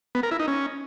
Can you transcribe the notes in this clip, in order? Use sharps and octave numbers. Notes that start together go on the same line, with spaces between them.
B3
A#4
E4
D#4
C#4